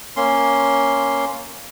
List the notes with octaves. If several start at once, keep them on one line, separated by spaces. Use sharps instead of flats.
A#3 C#4 C6